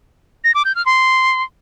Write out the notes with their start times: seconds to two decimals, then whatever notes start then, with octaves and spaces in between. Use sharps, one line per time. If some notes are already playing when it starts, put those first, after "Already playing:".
0.44 A#6
0.55 D6
0.65 G6
0.75 F6
0.86 C6